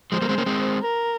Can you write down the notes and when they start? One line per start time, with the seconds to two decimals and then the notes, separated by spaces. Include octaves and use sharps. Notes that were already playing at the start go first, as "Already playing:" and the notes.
0.12 F3 G#3 C5
0.22 G3 A#3
0.29 G#3 C4
0.38 A#3 C#4
0.46 G#3 C4
0.82 A#4